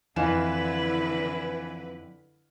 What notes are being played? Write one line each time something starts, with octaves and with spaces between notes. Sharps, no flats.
F2 D3 E3 E4 B4 F5 E7